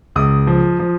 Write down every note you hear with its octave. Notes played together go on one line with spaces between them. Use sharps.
C#2 D#6
F3
F3